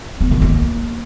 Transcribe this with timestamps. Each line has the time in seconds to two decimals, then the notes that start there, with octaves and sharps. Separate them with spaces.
0.21 B3
0.31 D#3
0.42 A#3